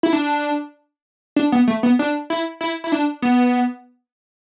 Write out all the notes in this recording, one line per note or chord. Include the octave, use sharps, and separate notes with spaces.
E4
D4
D4
B3
A3
B3
D4
E4
E4
E4
D4
B3